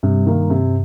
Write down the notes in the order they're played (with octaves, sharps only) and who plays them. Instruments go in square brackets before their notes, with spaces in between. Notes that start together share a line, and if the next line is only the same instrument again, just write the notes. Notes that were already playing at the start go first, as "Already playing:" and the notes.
[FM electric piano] G2 [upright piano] C3
[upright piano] D#3 A#3
C3